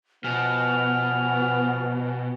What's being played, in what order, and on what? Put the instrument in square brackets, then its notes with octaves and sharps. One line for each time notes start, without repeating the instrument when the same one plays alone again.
[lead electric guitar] B2 [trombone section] F3 B3 [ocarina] G#5 [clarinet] F6